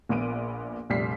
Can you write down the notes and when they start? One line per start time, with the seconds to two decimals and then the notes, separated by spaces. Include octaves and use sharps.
0.09 A#1 A#2 B3 D7 D#7
0.90 F1 A#1 G3 B6 C7